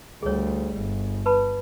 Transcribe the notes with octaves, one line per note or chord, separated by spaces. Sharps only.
D2 G3 G#4 C#5
G1
B4 A5 B5